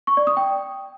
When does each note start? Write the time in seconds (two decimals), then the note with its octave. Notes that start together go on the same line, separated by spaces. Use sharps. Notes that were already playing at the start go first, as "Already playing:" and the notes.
0.07 C#6
0.17 D5
0.27 D#6
0.37 G5